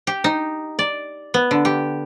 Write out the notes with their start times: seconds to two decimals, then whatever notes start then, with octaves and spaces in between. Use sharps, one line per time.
0.07 G4
0.24 D#4
0.79 D5
1.34 B3
1.51 D3
1.65 G4